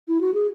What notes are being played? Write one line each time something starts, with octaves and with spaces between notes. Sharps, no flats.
E4
F#4
G#4